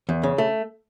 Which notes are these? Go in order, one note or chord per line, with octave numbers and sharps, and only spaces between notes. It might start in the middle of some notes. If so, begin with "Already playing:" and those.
E2
C#3
A3